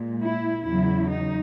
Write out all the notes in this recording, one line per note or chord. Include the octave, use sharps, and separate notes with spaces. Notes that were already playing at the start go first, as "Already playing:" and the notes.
Already playing: A#2 G#3
E4
E2 C#3 F#3 E4
D#4